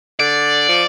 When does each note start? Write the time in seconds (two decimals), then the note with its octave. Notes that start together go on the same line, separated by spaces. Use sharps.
0.20 D3 D5
0.69 F3